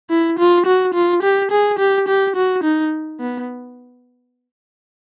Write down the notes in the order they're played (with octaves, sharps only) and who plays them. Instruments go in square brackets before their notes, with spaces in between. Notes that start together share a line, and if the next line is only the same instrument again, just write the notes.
[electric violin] E4
F4
F#4
F4
G4
G#4
G4
G4
F#4
D#4
B3